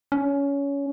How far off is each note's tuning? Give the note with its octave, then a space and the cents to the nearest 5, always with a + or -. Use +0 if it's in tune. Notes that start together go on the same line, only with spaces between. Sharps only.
C#4 +20